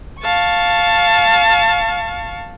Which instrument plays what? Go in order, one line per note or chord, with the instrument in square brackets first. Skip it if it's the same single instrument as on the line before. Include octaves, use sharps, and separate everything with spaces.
[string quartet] F5 A5 C#6